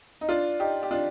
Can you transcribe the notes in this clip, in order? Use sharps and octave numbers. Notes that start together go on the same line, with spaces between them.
D#4
D4 F4
D#4 G4
G4
D4 F4